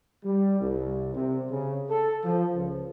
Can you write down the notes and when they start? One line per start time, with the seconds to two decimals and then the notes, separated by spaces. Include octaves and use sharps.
0.24 G3
0.60 C2
1.16 C3
1.51 C#3
1.90 A4
2.24 F3
2.54 C#2